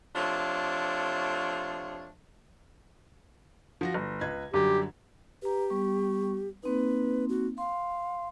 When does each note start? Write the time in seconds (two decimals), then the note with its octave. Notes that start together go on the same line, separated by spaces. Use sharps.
0.16 C3 F3 A3 D4 C#5 F5
3.81 F3 F#4 A#6
3.94 G1
4.21 C#2 B4 G#6
4.54 F#2 D3 G3 G4
5.42 G4 B4 A#5
5.70 G3 B3 C#6
6.63 A#3 C4 D#4 B4
7.29 F#4
7.58 F5 C6